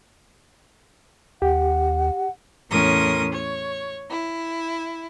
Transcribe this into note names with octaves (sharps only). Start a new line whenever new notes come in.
D#2 G4 F#5
E2 A2 C#4 A#4 C6 D#6
C#5
E4